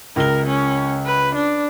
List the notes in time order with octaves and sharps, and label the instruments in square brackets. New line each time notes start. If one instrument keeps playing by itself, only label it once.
[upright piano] C#2 G7 [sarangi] A#4
[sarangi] C#4
B4
D4